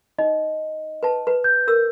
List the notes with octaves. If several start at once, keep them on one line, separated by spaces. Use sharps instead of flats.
D#4 D#5
B4 A5
B4
G6
A#4 E6